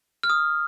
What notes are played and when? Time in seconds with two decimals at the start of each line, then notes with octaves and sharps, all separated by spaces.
0.23 F6
0.30 D#6